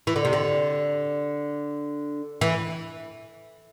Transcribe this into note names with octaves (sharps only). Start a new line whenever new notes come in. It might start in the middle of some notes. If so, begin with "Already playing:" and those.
E3
D3
C3
D3
E3